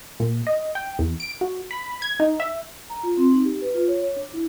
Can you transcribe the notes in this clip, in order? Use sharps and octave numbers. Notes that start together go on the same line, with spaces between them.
A#2
D#5
G5
E2
D7
F#4
B5
G#6
D#4
E5
A#5
F4
C4
D#4
G4
B4
F4
C#5
C#5
D4
E4